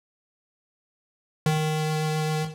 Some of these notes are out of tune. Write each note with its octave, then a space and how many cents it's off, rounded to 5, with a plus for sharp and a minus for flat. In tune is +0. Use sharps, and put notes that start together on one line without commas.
D#3 -5